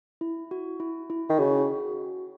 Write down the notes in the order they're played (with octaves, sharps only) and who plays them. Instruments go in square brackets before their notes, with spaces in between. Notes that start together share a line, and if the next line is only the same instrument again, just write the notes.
[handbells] E4
F#4
E4
E4
[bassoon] D#3
[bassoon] C#3 [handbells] F#4